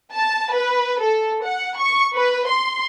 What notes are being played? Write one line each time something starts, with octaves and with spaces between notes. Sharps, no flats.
A5
B4
A4
F#5
C#6
B4
C6